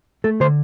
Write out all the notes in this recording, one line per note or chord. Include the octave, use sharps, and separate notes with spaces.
A3 A4
D3 C5